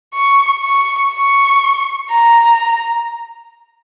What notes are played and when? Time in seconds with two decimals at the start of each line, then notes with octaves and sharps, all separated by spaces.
0.14 C#6
0.63 C#6
1.13 C#6
2.11 A#5